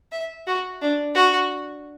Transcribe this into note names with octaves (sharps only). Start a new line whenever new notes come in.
E5
F#4
D4
F#4